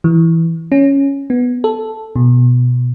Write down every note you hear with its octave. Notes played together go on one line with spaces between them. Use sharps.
E3
C#4
B3
A4
B2